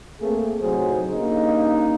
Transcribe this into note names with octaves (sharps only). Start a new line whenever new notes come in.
A3 A#3 C4 G#4
A2 C3 F#3 D#4 G#4 C5
G2 C#3 A#3 D#4